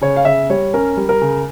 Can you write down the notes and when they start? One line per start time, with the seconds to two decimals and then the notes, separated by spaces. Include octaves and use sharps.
0.01 C#3 C#5
0.16 F5
0.25 C#3 E5
0.50 G3 C#5
0.74 C#4 A#4
0.97 G3
1.09 A#4
1.21 C#3